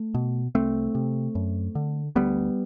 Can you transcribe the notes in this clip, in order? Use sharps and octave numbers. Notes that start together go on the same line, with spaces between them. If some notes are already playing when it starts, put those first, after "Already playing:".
Already playing: A3
B2
C2 A3 C4
C3
F#2
D3
D2 G3 B3